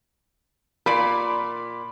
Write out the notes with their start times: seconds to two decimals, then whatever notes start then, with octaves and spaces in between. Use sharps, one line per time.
0.86 A#2 D5 B5